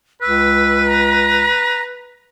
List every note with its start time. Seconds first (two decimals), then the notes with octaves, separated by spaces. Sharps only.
0.22 C#2 B4 E6
0.86 A#5